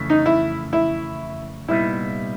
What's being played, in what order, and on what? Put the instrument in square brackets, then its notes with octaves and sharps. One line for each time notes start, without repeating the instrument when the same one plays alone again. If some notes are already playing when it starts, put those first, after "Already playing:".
Already playing: [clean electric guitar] F2 C#3 E3 A3
[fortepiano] D#4
E4
E4
[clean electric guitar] C2 A#2 G3 B3 D#4 [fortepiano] E4